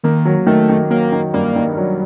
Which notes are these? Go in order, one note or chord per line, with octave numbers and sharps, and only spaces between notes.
D#3 A#3
F#3
D#3 A3
D#3
F#3 A#3
D#3
G2 A#3
D#3
F#3